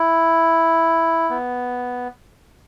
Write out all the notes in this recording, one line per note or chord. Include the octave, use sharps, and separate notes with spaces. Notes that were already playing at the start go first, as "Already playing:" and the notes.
Already playing: E4
B3